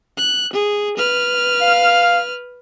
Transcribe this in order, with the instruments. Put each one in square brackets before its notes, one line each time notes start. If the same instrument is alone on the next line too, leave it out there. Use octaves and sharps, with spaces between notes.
[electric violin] F#6
G#4
B4 F6
[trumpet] F5